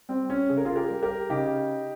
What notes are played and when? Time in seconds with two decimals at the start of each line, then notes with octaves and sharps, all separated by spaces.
0.09 G3 C4
0.30 C#4
0.49 C#3 G#4
0.57 A#4
0.65 F4 G#4
0.76 G4 A#4
0.90 G3
1.02 G4 A#4
1.29 C#3 D#4 G4